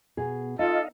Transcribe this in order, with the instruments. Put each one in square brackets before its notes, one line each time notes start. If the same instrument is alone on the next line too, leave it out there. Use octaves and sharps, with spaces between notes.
[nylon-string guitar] B2 G#4
[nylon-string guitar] D#4 [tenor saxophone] F4 [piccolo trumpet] A4 [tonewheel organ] D#5 F5